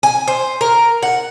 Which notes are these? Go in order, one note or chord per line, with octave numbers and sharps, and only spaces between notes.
G#5
C5
A#4
F#5